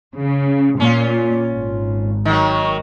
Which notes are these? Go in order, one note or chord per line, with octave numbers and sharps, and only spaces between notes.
C#3
A#2 C#4 F4
G#1
D#3 F#3